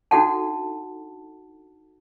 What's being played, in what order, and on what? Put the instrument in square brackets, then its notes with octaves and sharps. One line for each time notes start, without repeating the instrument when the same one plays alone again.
[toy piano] D4 D#4 F#4 A4 F#5 A5